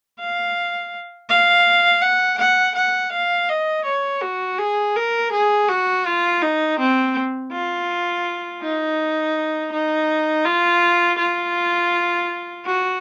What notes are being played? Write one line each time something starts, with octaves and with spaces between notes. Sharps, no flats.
F5
F5
F#5
F#5
F#5
F5
D#5
C#5
F#4
G#4
A#4
G#4
F#4
F4
D#4
C4
F4
D#4
D#4
F4
F4
F#4